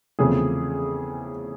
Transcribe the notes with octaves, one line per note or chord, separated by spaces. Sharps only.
E2 C#3 F3 A3 C4 G#4